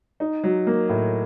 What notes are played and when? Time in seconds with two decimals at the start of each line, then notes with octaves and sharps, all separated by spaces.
0.20 D#4
0.44 F#3
0.67 A#3
0.89 A2